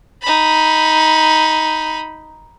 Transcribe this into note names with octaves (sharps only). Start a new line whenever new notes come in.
D#4 B5